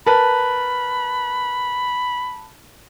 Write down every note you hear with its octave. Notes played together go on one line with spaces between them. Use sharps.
A#4 B4 A5 B5